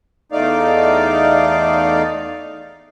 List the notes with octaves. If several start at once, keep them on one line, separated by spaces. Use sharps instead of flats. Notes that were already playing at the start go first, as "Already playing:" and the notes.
E2 A3 D#4 D5 F5